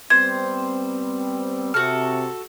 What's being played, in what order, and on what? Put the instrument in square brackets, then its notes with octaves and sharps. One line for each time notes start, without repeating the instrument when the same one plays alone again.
[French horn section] G3 B3 C4 [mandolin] C5 [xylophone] G#6
[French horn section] C3 [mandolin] F#4 A4 [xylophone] F6